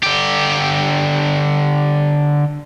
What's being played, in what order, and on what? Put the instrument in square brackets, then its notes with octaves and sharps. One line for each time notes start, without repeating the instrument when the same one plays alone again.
[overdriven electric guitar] D3 G4